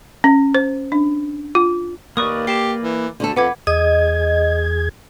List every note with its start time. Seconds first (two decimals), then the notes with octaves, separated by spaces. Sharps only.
0.24 C#4
0.55 C5
0.92 D4
1.55 F4
2.17 D#2 A#3 B4 D5 C#6 D#6
2.47 G4 C7 E7
2.84 E3
3.20 D2 D3 A3 A4
3.36 F2 B4 F#5 D6 G#6
3.67 E2 G#4 D#5 G#6